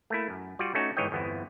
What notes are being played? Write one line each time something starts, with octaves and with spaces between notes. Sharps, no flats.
A3 A#3 E4
F#2
G3 F4 F#4 D5
A3 C#4 D#4 F#4
G1 G#2 E3 C#5 D#5 G5
G1 E2 B3 C4 E4